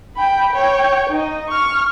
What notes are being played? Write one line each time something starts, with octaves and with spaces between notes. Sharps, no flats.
G5 B5
C#5 G5
D#4 D#5
C#6 F6